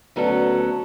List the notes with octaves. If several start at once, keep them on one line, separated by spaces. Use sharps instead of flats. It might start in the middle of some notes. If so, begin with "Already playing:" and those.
D2 F#3 B3 C#4 A4